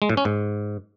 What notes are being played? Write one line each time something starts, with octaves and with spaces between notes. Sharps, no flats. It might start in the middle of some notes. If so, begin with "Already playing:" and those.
G#3
A2
C#4
G#2